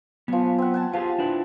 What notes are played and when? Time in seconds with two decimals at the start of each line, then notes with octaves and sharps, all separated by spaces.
0.28 F3 F#3 B3 G#5
0.59 C4 F#5
0.74 F#5 G#5 A5
0.93 F3 F4 G4 G#4 A5
1.19 D4 E4 B4